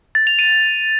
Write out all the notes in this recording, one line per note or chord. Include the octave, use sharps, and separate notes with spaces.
A6
F7
D#7